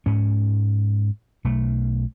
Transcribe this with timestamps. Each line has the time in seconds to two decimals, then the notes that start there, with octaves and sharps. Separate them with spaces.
0.06 G#2 C#4
1.44 B1 A3